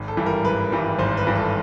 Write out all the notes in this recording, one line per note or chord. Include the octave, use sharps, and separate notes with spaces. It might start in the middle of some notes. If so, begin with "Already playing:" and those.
Already playing: G#1
A4
G2 E3 G3
A#4
G#1 B4
G2 E3 G3
G#1 C5
B4
G2 E3 G3
A4